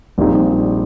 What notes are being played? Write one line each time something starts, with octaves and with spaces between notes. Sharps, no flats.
A#1 A#2 G3 C4 D#4